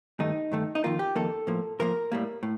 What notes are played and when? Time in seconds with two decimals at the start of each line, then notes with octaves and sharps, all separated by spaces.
0.19 G2 D#3 A3 D#4
0.52 G2 D#3 A3
0.75 D#4
0.84 F2 D#3 A#3 F4
0.99 G4
1.15 F2 D#3 A#3 A4
1.47 A2 F3 A#3
1.79 A2 F3 A#3 A#4
2.12 A2 G3 A#3
2.43 A2